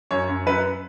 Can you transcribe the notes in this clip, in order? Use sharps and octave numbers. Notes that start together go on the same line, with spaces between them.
F#2 C#5
F#2
F#2 B4